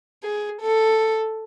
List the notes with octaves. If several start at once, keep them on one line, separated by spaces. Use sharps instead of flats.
G#4
A4